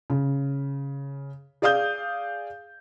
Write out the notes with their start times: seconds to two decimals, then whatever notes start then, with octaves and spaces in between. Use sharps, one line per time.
0.10 C#3
1.62 G#4 D5 F5 D#6 G6